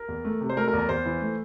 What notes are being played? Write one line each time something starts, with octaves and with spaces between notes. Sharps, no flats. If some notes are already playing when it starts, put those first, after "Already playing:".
Already playing: A#4
E2
A3
C3
C5
A3 A#4
A#4
E2
A#4
E2 C5
E3
A3